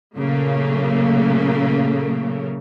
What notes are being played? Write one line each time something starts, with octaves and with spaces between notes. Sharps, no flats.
A#2 C#3 F#3 A3 A#3